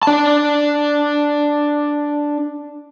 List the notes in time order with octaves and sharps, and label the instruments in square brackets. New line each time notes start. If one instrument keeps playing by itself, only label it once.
[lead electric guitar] D4 A5